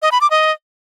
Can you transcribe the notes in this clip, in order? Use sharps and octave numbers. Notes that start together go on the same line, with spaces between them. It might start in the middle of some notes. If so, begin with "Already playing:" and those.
D#5
B5
D6
D#5